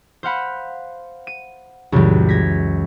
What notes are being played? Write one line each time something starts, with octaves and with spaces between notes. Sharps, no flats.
C5 F5 F#5 B5
D#7
C#2 F#2 A#2 E3 G3
G#6 A#6 B6